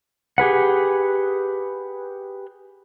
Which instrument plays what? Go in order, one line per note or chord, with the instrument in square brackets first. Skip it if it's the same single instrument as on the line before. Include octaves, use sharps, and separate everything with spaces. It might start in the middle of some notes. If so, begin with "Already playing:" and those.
[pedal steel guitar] G4 G#4 B4 F#5